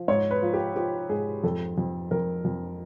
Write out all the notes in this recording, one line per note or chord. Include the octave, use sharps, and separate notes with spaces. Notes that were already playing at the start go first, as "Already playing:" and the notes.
Already playing: F3
G#2 C#5
B4
F3
G4
F3 G4
G#2 G#4
F2 A4
F2
F2 A#4
F2